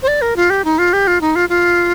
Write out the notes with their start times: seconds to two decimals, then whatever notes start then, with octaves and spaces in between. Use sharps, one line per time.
0.03 C5
0.08 D5
0.22 A#4
0.36 F4
0.50 G4
0.65 D#4
0.78 F4
0.93 G4
1.07 F4
1.21 D#4
1.36 F4
1.49 F4